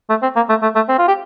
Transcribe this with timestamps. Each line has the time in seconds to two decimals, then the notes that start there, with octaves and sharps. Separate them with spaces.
0.10 A3
0.22 C4
0.36 A#3
0.49 A3
0.62 A3
0.75 A3
0.89 C4
0.99 F4
1.08 G4